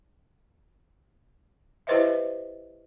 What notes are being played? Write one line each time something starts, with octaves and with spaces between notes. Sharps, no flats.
E4 G4 B4 C5 D#5 E5